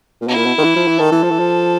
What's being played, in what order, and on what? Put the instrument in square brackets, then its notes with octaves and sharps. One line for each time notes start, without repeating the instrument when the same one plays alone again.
[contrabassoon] A#2
[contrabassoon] B2 [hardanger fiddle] E4
[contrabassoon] A#2
B2
D#3
E3
F3
E3
[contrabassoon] D#3 [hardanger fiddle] A4
[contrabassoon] E3
F3
E3
F3